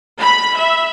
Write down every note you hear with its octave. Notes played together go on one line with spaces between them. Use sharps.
B5
E5